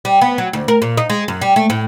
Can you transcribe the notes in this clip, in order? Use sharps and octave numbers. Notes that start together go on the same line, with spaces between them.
G3
B3
F#3
D2
A#4
A#2
D#4
G#3
F#2
G3
A3
A2